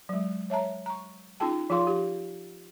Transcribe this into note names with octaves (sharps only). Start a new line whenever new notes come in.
F#3 G#3
C#5 E5 A5 A#5
A#5 C#6
C#4 D#4 F4 G#4 G5 A5
F3 F4 G#4 F5 C6
G4